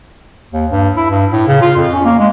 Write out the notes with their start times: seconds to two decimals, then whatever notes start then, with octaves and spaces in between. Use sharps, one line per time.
0.52 D#2
0.71 G2
0.97 E4
1.10 G2
1.32 A2
1.48 C#3
1.62 F4
1.77 F2
1.93 C#4
2.05 A#3
2.19 G#3